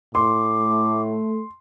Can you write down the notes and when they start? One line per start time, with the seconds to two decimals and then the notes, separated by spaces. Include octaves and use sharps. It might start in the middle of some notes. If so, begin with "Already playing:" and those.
0.15 A2 C6 D6
0.61 A3